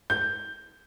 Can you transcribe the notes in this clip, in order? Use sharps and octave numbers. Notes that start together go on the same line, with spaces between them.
G6